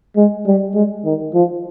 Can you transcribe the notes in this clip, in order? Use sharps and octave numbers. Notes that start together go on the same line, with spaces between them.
G#3
G3
G#3
D#3
F3